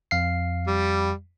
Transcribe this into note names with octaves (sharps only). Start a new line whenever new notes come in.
F2 F5 C7
G3